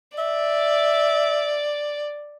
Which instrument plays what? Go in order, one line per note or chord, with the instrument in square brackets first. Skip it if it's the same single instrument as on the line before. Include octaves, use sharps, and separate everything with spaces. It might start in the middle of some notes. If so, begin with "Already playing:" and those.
[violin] D5 [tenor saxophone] E5